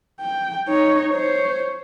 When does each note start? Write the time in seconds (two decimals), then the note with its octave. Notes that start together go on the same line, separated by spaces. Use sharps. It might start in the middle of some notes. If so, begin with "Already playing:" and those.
0.21 G5
0.68 D#4 C#5
1.13 C5 C#5